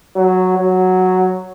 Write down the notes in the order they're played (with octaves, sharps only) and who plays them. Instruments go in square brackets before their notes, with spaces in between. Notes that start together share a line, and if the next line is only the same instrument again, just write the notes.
[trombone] F#3
F#3